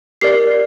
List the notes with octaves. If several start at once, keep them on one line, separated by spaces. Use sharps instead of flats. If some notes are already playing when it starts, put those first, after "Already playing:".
G4 A#4 D5 C7